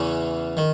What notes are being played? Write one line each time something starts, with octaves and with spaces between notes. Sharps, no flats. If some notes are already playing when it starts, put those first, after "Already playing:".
Already playing: E2 C#3 E3 C#4
D#3